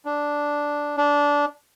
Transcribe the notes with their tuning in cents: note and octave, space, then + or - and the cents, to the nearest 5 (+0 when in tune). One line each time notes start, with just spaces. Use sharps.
D4 -5
D4 -15